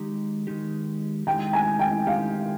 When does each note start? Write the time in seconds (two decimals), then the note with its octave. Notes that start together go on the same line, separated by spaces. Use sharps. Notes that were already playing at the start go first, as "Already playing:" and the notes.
Already playing: D#3 G#3 D#4 G4
0.47 D#3 G#3 D#4 G4
1.27 D#3 G#3 D#4 G4 G5
1.53 G#5
1.79 G5
2.07 D#3 G#3 D#4 G4 F5